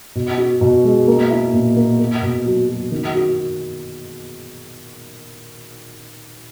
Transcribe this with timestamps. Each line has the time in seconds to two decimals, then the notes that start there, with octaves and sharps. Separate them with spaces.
0.15 B2
0.38 F#4
0.61 B2
0.85 G#3
1.08 A#3
1.30 E4
1.53 A#2
1.77 A#3
1.99 A#3
2.22 B2
2.46 F#3
2.69 F#3
2.92 D#3
3.15 F#4